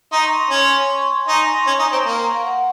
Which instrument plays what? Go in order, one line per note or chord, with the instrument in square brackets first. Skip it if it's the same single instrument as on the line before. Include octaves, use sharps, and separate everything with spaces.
[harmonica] D#4 [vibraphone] C6
[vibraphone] C#6
C6
[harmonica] C#4 [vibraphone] C6
[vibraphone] C6
C#6
C6
G#5
[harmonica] D#4
[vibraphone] C#6
C6
[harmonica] C#4 [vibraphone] C#6
[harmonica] D#4
[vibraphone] C6
[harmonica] C4
[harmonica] A#3 [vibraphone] A#5
[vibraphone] F#5